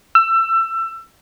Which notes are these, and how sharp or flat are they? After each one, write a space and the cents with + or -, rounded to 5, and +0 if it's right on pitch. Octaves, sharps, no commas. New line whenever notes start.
E6 +25